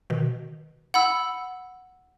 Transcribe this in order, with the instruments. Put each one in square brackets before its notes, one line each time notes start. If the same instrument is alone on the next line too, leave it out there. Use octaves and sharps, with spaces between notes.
[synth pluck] B2 D#3
[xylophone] F#5 B5 E6